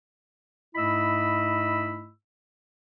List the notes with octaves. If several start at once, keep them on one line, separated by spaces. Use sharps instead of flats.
G#2 A3 E4 D#5 B5 E6